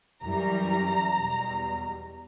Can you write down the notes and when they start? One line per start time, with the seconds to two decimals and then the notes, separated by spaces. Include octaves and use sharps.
0.22 F#2 E3 G3 A#5
1.14 E2 B2 G3